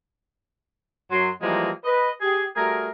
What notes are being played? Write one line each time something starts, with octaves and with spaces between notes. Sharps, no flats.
F#2 F#3 C6
E3 F3 G3 G#3 A#3 D#4
B4 D#5
G4 G#4
G3 A3 F#4 G#4 A#4